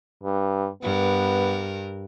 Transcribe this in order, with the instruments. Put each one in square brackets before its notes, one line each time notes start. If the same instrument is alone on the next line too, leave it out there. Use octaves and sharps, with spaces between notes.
[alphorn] G2
[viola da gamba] G2 A#4 [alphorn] B3